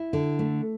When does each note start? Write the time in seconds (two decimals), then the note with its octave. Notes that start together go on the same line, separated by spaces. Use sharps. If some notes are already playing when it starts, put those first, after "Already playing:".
Already playing: E4
0.13 D3
0.39 A3